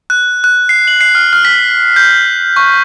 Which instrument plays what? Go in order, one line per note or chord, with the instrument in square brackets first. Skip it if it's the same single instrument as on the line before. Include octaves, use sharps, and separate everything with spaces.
[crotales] F#6
F#6
C7
F#7
C7
F6
F6
B6
G6
C#6